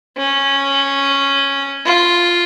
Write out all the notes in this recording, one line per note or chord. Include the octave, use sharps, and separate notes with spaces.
C#4
F4